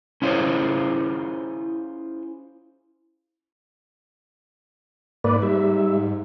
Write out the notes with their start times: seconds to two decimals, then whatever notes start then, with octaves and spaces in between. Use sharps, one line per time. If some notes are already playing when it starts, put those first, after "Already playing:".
0.22 C#4 E4 F4 G#4 C5 C#5
5.24 G#2 A#3 B4 D5
5.42 G3 E5